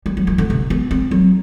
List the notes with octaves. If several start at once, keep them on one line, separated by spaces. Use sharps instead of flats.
G3
F#3
E3
D3
C3
B3
C4
F#3